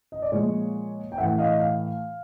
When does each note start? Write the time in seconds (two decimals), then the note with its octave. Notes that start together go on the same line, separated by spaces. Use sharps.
0.12 D#5
0.22 D5
0.32 A#2 F3 G#3 C#5
1.12 G5
1.18 A2 E3 A3 E5 F#5
1.38 D#5 F5
1.60 F5